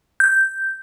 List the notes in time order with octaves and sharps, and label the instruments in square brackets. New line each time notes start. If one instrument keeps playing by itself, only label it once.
[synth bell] G6